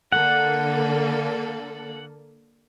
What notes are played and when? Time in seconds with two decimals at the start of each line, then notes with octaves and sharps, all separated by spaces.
0.12 D3 A#3 A4 F#5